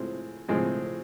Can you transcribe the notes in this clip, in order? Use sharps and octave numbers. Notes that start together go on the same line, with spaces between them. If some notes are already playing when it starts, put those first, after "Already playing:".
Already playing: A2 F3 G#3 C4
A2 F3 G#3 C4